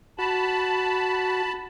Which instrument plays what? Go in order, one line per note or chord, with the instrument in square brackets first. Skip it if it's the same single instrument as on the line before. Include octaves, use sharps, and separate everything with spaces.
[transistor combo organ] F#4 [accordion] A5 B5